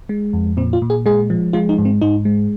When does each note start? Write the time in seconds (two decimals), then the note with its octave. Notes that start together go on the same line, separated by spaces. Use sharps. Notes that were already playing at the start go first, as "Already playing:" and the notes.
0.09 G#3
0.33 F2
0.57 A#2 C4
0.73 F4
0.82 A#2
0.90 G#4
1.06 G#3 G#4
1.30 F3
1.53 G#3 F4
1.69 D#4
1.78 G#2
1.85 C4
2.01 G#2 D#4
2.25 G#3